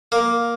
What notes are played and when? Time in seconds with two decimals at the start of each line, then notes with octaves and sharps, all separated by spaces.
0.12 A#3